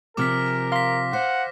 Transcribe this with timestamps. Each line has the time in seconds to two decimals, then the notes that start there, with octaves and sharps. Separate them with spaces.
0.17 C3 F3 G#4 A#4 D6 F6 B6
0.72 F5 C6 A#6 B6
1.13 C5 F#5